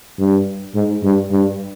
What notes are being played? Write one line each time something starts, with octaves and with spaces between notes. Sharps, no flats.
G2
G#2
G2
G2